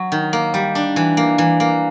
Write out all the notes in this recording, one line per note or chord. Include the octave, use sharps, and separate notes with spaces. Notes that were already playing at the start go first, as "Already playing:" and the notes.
Already playing: F#3
D#3
A#3
G3
D4
E3
A#3
E3
A#3